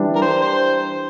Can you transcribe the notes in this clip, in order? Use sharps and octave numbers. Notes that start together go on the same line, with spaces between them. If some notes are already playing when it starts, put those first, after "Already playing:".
Already playing: E3 G3 D4
A#4
C5
C5